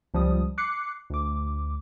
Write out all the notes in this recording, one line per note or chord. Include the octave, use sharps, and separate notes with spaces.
C#2 F3 G3 D#6
D6 F#6 C7 C#7
D2 D6